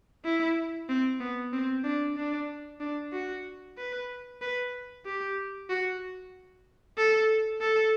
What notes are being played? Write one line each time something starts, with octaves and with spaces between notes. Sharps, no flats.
E4
C4
B3
C4
D4
D4
D4
F#4
B4
B4
G4
F#4
A4
A4